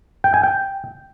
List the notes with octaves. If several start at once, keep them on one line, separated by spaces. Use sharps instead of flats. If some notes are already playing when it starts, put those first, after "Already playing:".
G5
G#5
G5